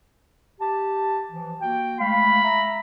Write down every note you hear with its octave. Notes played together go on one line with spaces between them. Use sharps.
G4 A5
E3 F3
A#3 F#4 G5
G#3 A3 F5 B5
E5 A#5